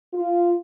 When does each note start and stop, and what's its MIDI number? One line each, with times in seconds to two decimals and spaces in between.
0.14 0.54 65